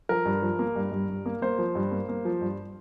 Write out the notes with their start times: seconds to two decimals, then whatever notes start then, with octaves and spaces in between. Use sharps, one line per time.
0.09 F3 A#4
0.25 G2
0.42 F3
0.59 A#3
0.76 G2
0.92 G2
1.08 G2
1.26 A#3
1.42 A#3 C5
1.58 F3
1.75 G2
1.91 A#3
2.09 A#3
2.25 F3
2.41 G2